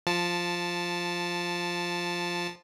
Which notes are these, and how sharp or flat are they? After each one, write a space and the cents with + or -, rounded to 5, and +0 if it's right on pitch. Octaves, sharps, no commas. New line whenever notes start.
F3 +0 A5 +0